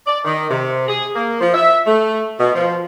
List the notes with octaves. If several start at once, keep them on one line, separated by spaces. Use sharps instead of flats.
D5
D#3
C3
G#4
A#3
F3
E5
A3
B2
F3